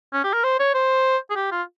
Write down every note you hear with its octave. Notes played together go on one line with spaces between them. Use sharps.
C#4
G4
A#4
C5
C#5
C5
G#4
G4
F4